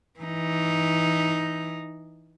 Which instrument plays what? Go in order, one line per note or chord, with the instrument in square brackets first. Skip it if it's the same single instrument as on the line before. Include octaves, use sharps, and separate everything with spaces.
[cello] E3 D#4